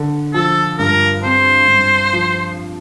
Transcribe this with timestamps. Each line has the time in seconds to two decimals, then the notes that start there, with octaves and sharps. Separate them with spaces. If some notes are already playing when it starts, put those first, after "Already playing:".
Already playing: D3
0.34 F3 A4
0.78 G2 A#4
1.24 C4 C5
1.68 G2
2.13 F3